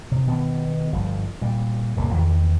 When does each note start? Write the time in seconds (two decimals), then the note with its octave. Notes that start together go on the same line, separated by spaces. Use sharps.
0.11 C3
0.27 B2 D#3 B3
0.93 G1 F3 G3
1.41 A#2 G3
1.96 E1 C2 A2 A#3
2.13 E2 D#3 E3